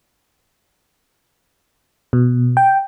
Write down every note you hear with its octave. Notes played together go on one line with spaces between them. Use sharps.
B2
G5